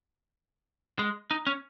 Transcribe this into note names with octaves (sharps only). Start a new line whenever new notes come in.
G#3
D#4
C#4